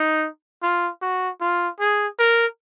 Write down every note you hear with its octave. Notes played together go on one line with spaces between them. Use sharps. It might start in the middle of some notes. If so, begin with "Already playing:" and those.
Already playing: D#4
F4
F#4
F4
G#4
A#4